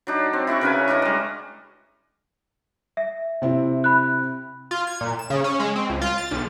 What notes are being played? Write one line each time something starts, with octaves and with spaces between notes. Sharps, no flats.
F#3 D4 D#4
C4
E4 F#4 D5 C#6
C#3 A#4 B4 G#5
D4 F#4 A#4 D#5
G3 G#3
E5
C3 C4 E4
B5 F#6
F4
G#6
A#2
E7
C#3
C#4
G#3
C4
C#2
F4
A6
B1